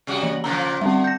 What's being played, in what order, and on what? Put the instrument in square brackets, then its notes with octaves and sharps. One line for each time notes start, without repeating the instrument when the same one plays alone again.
[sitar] C3 G3 F#4
[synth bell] E3 F#7
[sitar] A#2 C#3 F3 [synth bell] A#5
[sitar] D3 [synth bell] G3 C4
[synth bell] G6 A#6